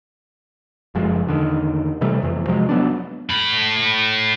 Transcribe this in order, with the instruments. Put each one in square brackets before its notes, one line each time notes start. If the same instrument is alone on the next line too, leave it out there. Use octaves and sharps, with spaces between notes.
[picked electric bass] F#1 F#2 F3 G#3
E2 D3 D#3
C3 E3 G3 A3
F2 E3
C3 F3 F#3 G#3
F#3 B3 D4
[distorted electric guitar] A2 B5